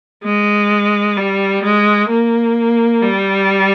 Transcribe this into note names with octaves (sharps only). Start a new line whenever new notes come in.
G#3
G3
G#3
A#3
G3